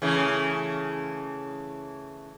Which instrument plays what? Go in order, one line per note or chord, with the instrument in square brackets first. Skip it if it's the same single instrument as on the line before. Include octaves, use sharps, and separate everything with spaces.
[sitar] C#3 E3 A3